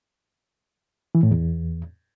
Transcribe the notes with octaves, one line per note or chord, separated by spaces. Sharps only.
E3
A2
E2